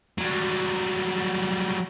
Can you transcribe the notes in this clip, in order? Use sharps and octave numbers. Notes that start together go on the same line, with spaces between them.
F#3 G3